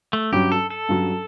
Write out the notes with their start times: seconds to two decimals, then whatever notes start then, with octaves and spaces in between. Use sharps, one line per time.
0.13 A3
0.32 G2 F#3 C#4 G4
0.52 A4
0.70 A4
0.89 G2 F#3 C#4